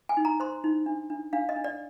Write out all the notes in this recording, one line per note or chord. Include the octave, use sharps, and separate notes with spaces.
G#5
D#4
A#5
C5 C6
D#4
D4
D4
D4 F5
D#5
D4
D5